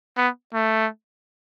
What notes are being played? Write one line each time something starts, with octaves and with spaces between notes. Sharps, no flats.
B3
A3